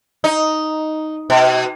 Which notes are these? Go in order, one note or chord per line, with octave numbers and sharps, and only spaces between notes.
D#4
B2